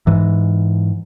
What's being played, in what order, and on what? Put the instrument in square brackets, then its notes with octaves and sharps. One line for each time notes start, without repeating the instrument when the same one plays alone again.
[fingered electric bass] G#2 E3